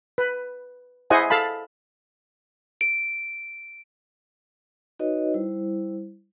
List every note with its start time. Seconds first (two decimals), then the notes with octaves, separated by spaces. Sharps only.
0.18 B4
1.10 E4 G#4 C5 D#5 F#5 G#5
1.30 A4 F5 A5 B5
2.81 D7
4.99 D#4 F#4 B4 C#5 D#5
5.34 G3 E4 C5